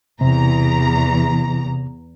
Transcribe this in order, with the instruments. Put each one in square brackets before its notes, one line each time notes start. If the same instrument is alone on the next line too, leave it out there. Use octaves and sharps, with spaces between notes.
[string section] E2 A#5 [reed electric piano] C3